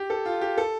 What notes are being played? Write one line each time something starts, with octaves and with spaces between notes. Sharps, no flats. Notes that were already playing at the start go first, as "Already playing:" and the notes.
Already playing: G4
A4
F4
G4
A4